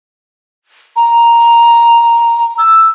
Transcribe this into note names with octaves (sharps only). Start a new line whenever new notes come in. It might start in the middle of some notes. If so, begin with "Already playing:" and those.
A#5
E6